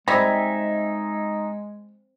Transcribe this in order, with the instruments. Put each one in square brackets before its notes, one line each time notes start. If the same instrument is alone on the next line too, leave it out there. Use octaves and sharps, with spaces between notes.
[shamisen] G3 [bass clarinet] G#3 [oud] C4 [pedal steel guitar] D#4 E5 G#5